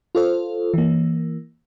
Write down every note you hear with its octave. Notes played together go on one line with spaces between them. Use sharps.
F4 A4 C5
E3 A#3